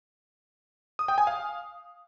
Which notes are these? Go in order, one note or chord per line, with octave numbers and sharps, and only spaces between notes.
D#6
G5
G#5
F5